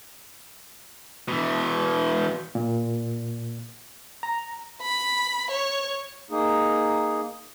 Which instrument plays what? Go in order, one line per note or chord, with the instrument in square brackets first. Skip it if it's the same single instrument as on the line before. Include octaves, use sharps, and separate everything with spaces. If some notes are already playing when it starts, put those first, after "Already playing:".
[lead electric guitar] B2 E3
[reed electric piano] A#2
A#5
[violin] B5
C#5
[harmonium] A#3 D#4 G#4